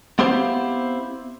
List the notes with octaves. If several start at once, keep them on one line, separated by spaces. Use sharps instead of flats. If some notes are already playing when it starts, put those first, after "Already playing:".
B3 C4 E4 G4 C5 F5